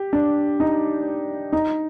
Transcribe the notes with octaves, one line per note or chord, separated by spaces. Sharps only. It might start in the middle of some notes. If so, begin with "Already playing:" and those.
Already playing: G4
D4
D#4
D#4